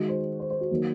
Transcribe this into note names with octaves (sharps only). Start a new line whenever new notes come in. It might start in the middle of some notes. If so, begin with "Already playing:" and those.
Already playing: D#3 G#3 F#4
C5
C5
C5
F#4
D#3 F#3 A#3